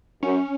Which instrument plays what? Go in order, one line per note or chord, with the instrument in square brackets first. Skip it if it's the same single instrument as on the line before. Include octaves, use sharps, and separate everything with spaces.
[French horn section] F#2 [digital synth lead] C#4